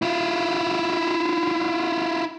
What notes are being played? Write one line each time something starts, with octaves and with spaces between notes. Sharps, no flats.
E4 F4